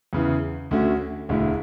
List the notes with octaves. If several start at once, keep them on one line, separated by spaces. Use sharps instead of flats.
E2 C#3 E3
D2 D3 A3 C#4 F#4
E1 D2 D3 A3 E4